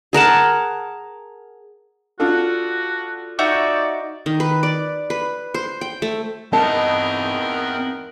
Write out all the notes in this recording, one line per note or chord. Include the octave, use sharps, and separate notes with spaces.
G#4 A#4 F#5 A5
D4 F4 F#4 A4
D#4 F#4 D5 E5
D#3
B4
D5
B4
C5
G5
A3
E2 C4 D#4 A#4 D#5 A5